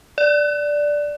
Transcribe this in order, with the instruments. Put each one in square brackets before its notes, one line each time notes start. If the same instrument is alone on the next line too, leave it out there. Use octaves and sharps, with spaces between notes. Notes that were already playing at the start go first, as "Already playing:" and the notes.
[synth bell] D5